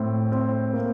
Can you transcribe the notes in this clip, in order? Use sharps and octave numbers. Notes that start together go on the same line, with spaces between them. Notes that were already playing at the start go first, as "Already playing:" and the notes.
Already playing: A2 C4
C4
A#3